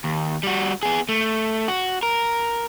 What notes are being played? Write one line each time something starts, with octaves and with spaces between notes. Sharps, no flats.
D#2
G3 F#4
B3 G#4
A3
F#4
A#4